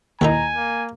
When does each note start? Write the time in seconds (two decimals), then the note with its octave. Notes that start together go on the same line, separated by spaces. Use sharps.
0.21 D#2 D#4 E4 A4 G#5 A#5
0.55 A#3